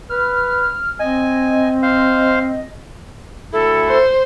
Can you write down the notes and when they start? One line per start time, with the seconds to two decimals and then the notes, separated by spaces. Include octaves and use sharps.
0.10 B4 F6
0.99 C4 D#5 G#5
1.83 C5 F5
3.53 D2 E4 A4
3.88 C5